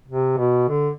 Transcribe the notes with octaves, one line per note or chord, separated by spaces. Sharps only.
C3
B2
D3